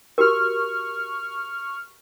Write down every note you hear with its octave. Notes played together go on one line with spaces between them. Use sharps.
F#4 G4 A#4 C#6 F6